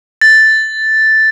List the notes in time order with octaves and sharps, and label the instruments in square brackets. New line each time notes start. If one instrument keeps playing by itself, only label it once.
[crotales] A6